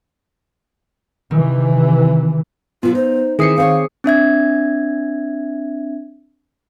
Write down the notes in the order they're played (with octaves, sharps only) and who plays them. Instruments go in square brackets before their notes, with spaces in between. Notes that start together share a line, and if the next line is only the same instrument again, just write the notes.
[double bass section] C3 E3 [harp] D#3
[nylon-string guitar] B2 F#3 [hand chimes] B3 [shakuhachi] F4
[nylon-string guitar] D#4 [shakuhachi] C5
[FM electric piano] D#3 C7 C#7 [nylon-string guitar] E3 C4 E4 [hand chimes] G#4 D#6
[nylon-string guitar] C4 C5 C#5 [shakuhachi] F5
[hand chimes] C4 D4 E5 G#6